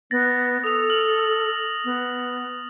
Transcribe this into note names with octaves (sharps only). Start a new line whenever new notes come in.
B3 A6 A#6
A4 D#6 F7
F6 F7 F#7
B3